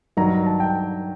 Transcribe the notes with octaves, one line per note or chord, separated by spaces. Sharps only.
G2 D#3 F#3 A#5
A#5
A5
G5